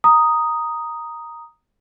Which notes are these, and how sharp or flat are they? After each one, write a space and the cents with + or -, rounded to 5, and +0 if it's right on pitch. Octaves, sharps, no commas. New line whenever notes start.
A#5 +0 D#6 +0